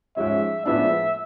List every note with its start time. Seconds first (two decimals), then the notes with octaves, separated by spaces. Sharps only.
0.17 G#2 F3 G#3 C#4 E5
0.66 A2 F3 G#3 B3 D4 E5